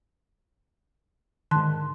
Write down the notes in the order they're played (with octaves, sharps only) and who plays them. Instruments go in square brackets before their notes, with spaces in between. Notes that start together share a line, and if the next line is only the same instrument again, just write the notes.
[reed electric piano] G#2 D3 [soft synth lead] D#3 [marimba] A5 C6 F#6